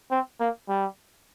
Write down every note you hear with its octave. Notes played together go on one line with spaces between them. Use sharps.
C4
A#3
G3